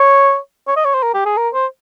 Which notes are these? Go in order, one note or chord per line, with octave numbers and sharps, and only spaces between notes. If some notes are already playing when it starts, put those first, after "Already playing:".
Already playing: C#5
C#5
D#5
C#5
C5
A#4
G4
G#4
A#4
C5